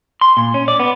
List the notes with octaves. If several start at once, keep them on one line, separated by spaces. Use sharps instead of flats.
C6
A#2
C#4
D5
B3